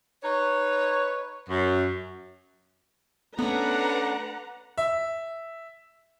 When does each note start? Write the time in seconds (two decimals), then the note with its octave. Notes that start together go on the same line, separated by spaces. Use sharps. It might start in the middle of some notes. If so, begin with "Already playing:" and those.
0.24 D#4 B4 C#5
1.49 F#2
3.39 A3 B3 C#4 D4 B4 F#5 A#5
4.78 E5